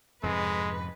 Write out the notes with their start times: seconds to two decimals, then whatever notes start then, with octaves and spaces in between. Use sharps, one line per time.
0.23 F2 G#2 C3 G#3 B4